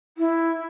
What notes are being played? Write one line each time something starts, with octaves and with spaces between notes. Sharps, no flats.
E4